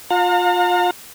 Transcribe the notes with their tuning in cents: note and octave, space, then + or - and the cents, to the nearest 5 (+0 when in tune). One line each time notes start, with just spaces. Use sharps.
F4 +20 F5 +40 A#5 -40